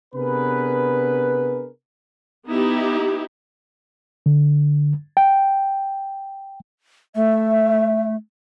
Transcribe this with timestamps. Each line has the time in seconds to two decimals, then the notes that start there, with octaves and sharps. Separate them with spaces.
0.15 C3 B3 D4 G#4 A#4 B4
2.47 B3 D#4 E4 G4
4.26 D3
5.17 G5
7.15 A3 E5